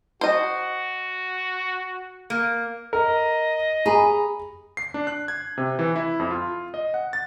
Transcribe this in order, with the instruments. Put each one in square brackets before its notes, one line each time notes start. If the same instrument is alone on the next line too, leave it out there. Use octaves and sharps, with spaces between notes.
[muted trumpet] F#4 [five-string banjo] C5 D#5
[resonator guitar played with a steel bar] A#3
[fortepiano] A#4 [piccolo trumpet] D#5
[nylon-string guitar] G#4 [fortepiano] A#5 B5
[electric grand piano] C7
D4
F#6
G#6
C3
E3
E4
F2
F4
D#5
F#5
A6